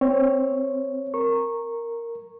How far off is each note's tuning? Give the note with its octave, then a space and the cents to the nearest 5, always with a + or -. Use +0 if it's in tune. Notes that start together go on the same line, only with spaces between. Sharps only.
C4 +0 C#5 +0
A#4 -5 C#6 -15